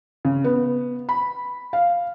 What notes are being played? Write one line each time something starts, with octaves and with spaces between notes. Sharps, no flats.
C#3
B3
B5
F5